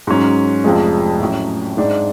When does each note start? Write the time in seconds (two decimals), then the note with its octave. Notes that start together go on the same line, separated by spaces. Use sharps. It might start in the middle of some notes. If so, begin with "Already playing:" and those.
0.07 G#2 F#3 C#4
0.64 F1 F2 F3 G#3
1.20 A2 F#3 C#4
1.77 G#2 G#3 D4